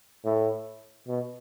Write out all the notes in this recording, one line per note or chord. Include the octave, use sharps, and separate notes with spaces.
A2
B2